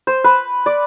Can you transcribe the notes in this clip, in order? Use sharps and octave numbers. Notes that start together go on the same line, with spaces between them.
C5
B4
D5